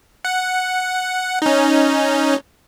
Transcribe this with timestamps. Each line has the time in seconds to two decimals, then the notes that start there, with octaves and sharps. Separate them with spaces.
0.25 F#5
1.42 C#4 D#4